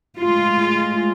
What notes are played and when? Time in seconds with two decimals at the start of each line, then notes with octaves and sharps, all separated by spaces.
0.20 A2 G#3 F4